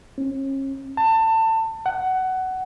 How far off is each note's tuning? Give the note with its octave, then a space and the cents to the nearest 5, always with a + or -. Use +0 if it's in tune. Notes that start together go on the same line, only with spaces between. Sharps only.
C#4 -35
A5 +25
F#5 +15